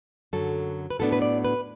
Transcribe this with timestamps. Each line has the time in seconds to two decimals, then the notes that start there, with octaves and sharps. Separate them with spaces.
0.33 F#2 D3 F#3 A4
0.90 B4
0.99 A2 F#3 B3 D4 A4
1.12 B4
1.22 D5
1.45 B4